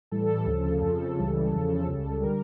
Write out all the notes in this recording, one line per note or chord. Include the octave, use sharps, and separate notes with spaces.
A2 E3 G3 A4
D2 C#3 F3
F2 C#3 F3 A4
C#2 C#3 E3 G3
E2 C#3 F3 A4
C#2 C#3 G3
D3 G3 A#4